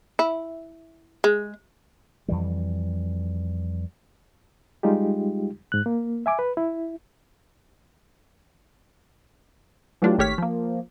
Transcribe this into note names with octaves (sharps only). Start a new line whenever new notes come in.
E4
G#3
F2 E3 G3
G3 G#3 D#4 F4 G4
G#2 F#6
A#3
E5 G#5 D6
B4
E4
E3 F#3 A3 D4 F4 G4
G#1 A3 G4 C#5 F6 B6
F3 A#3